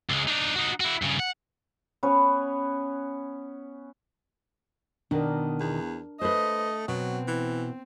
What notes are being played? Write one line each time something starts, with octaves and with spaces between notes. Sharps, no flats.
C#2 G#3
D4 D#4
D#4 F#4
E4 F#4
G2 C#3
F#5
B3 C#4 B4 C#5
B2 D#3 D4 A#4
E2
A3 B4 C5 D#5
B2 F#3 C4
E3